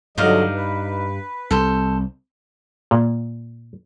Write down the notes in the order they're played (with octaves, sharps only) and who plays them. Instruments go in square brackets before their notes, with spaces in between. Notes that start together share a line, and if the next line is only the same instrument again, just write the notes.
[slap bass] G2 [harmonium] D3 F#3 D#5 [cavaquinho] D#4 D5 F5
[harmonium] B4
[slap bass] C2 [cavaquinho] A4 C5
[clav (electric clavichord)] A#2